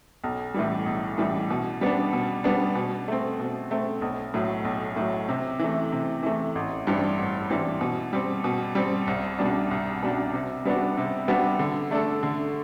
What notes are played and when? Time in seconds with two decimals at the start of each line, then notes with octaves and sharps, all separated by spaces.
0.24 B1
0.54 A2 E3 G3
0.86 B1
1.18 A2 E3 G3
1.50 B2
1.81 G3 B3 D4
2.13 B2
2.44 G3 B3 D4
2.75 B2
3.08 A3 C4
3.40 B2
3.71 A3 C4
4.02 B1
4.34 A2 F#3
4.65 B1
4.96 A2 F#3
5.29 C3
5.59 E3 A3
5.92 C3
6.23 E3 A3
6.55 A1
6.87 G2 E3 G3 C4
7.18 A1
7.50 G2 E3 G3 C4
7.81 B2
8.13 G3 C4
8.44 B2
8.75 G3 C4
9.07 C2
9.38 B2 G3 D4
9.71 C2
10.02 B2 G3 D4
10.33 C3
10.65 G3 B3 D4 F#4
10.97 C3
11.28 G3 B3 D4 F#4
11.59 D3
11.91 A3 D4 A4
12.23 D3